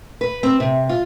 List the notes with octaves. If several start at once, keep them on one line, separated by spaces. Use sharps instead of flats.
B4
C4
C3
F4